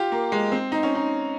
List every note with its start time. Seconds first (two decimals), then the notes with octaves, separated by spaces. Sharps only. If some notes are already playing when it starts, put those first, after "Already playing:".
Already playing: F4 G4
0.12 A#3
0.32 G#3
0.52 C4
0.72 D#4
0.83 C#4
0.95 D#4